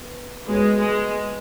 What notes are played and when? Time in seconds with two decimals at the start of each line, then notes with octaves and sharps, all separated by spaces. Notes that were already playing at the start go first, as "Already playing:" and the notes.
Already playing: B3
0.47 G#3 B3 F#4 C#5
0.80 G#3